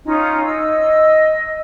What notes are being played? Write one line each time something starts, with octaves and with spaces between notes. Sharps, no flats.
C#4 D#4 F4
D#5 E6